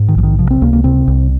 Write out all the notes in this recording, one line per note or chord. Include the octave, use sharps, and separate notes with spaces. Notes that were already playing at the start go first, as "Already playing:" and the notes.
Already playing: G#2
D#3
A#1 F3
D#3
C3 F3
C4
C#2 A#3
A#3
C3 C4
C2